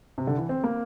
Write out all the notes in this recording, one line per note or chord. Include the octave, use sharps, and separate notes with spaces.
C3
D3
E3
C4
A#3